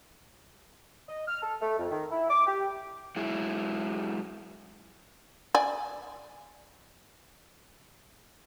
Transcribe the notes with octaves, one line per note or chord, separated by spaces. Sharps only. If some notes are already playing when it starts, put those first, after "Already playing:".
D#5
F6
A4
A3
F2
D#3
E4
D6
G4
F#3 G#3 E4 G#4
D5 G#5